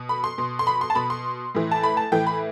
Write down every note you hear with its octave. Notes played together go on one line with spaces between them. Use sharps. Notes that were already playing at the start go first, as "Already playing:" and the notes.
Already playing: B2
B5
C6
B2
C6
B5
C6
A5
B2 B5
C6
A2 E3
A5
B5
A5
A2 E3 G5
B5